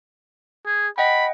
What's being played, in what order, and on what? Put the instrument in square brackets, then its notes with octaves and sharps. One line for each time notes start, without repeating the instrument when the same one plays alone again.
[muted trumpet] G#4
[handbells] D#5 F#5 G5 [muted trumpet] B5